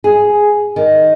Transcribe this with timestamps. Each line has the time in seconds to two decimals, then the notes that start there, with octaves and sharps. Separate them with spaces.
0.04 G#4
0.76 D#3